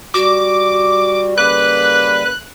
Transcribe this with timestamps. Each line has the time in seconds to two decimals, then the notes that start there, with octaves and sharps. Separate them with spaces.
0.14 G3 F#4 D6
1.38 C#3 A#3 B4 D6 F#6